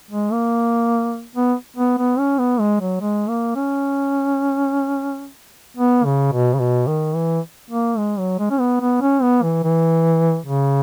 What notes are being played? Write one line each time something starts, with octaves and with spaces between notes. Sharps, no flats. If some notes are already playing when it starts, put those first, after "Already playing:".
G#3
A#3
B3
B3
B3
C#4
B3
G#3
F#3
G#3
A#3
C#4
B3
C#3
B2
C#3
B2
D#3
E3
A#3
G#3
F#3
G#3
C#4
B3
B3
C#4
B3
E3
E3
C#3